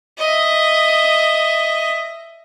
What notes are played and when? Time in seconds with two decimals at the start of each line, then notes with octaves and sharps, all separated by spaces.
0.18 D#5 E5